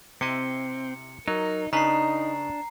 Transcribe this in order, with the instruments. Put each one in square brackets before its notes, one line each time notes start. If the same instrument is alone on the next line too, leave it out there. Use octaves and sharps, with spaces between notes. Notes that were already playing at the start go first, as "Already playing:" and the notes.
[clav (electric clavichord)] C3 E4 D#5 [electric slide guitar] C4 [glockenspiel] C#7
[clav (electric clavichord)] F#3 [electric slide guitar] D#4 [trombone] A#4
[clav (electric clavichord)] C#3 B4 C5 [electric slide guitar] D4 [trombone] D#4 [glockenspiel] A#5 C7